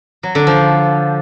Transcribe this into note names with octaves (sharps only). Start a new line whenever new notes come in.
F#3
D3
F3